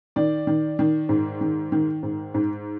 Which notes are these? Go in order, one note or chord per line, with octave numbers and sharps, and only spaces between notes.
D#3 D5
D#3
D#3
G#2
D#3
D#3
G#2
G#2